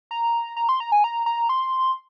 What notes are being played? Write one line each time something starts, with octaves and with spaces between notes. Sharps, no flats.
A#5
A#5
C6
A#5
G#5
A#5
A#5
C6